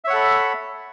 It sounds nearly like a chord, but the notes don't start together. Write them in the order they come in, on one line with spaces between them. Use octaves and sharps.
E5 C#5 F#5 A4 B5